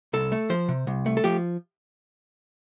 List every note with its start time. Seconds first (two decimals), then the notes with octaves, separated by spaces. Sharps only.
0.13 C2 A4
0.32 A3
0.50 F3 C5
0.68 C3
0.87 C2
1.06 A3
1.17 A4
1.24 F3 G4